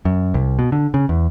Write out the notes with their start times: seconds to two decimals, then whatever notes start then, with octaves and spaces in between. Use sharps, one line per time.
0.05 F#2
0.34 C2
0.59 B2
0.72 D3
0.94 C#3
1.09 E2